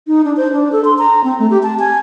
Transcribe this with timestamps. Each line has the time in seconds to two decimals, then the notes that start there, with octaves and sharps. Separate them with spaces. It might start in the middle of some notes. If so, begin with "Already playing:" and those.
0.07 D#4
0.25 D4
0.37 C5
0.52 D4
0.72 A4
0.85 C6
0.98 A#5
1.24 C4
1.39 A3
1.50 G4
1.63 A5
1.79 G#5